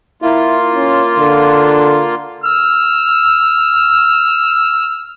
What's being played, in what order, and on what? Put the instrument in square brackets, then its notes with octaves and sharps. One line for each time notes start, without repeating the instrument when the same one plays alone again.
[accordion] A#3 F4 [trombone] E4
[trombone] C#4
D3
[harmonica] E6 F6